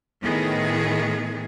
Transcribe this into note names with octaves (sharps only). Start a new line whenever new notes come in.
A2 D#3 B3 G#4